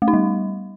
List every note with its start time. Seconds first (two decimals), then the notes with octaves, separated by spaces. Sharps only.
0.02 A3
0.08 D#4
0.13 G3